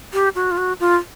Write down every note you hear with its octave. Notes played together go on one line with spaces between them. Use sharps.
G4
F#4
F4
F#4
F4